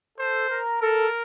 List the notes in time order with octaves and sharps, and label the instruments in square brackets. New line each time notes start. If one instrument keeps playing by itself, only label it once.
[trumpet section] A4 [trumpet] C5
[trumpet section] A#4
[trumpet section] A4 [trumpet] A#4